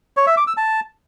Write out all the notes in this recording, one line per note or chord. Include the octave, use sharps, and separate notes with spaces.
C#5
E5
D6
E6
A5